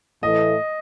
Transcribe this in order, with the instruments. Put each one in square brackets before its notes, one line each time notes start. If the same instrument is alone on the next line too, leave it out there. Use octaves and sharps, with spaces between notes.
[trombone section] A2 E3 A3 [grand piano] D#5